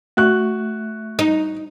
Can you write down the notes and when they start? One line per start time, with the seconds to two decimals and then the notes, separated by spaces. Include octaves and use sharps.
0.17 A3 F#4 F#6
1.19 D#4